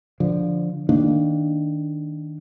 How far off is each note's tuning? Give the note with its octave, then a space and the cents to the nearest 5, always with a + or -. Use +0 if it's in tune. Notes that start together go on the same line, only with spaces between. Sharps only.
D3 +0 F3 +0
D#3 +0 A#3 +0 D4 +0